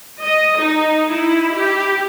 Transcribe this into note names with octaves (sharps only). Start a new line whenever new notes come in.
D#5
D#4
E4
G4